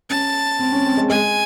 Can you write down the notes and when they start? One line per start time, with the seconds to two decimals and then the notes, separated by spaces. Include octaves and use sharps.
0.10 C#4 A5
0.59 C4
0.72 C#4
0.85 C4
0.97 G#3
1.10 G#3 G#5